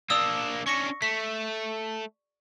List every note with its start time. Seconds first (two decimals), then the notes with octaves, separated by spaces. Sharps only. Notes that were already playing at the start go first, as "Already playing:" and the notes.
0.10 A#3 D4 D5 D#6 E6
0.67 C#4 D4 C#6 A#6 C#7
1.02 A3 B6